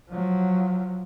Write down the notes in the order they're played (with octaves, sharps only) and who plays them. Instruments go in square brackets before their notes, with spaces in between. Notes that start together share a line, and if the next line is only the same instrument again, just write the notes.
[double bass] F3 F#3